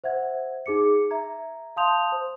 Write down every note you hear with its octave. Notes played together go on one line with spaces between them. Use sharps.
C5 E5 F#5 G#6
D#4 G#4 D6 C#7
E5 A#5 G#6
F5 A5 C6 D#6 G6 F7
C5